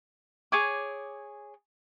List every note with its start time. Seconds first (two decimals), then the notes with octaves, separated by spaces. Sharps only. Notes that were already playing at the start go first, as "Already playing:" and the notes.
0.52 G#4 C#5 D6